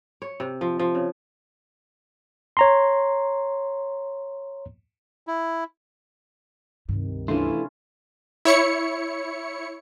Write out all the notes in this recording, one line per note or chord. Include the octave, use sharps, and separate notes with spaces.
C#5
C3
F3
F3
C#3
C#5 A#5 C6
E4
C#2 G2 C3 D#3
E3 A3 C#4 D4 E4 F4
E4 C#5 C#7